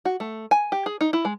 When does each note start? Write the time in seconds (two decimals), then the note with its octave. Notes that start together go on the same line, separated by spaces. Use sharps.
0.05 F#4
0.20 A3
0.51 G#5
0.72 G4
0.86 G#4
1.01 D#4
1.13 E4
1.25 G#3